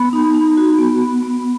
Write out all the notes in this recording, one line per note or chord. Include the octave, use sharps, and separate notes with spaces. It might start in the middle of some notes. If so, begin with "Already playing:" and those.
Already playing: B3 B5
D#4
D#4
F#4
B3
B3
B3